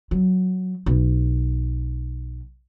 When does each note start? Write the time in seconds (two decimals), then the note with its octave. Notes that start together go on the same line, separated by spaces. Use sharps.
0.11 F#3
0.86 B1